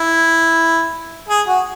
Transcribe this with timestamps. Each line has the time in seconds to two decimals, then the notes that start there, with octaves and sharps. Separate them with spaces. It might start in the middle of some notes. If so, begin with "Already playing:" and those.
Already playing: E4
1.29 G#4
1.47 F#4